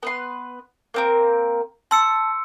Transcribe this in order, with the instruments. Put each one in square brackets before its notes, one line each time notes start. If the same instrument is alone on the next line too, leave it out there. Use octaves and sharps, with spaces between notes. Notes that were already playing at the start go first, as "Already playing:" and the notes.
[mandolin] B3 B4 C6
A#3 C4 A#4
[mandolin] A5 [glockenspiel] C6 E6 C#7